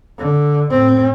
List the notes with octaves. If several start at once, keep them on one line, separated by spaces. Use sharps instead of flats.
D3
A2 C4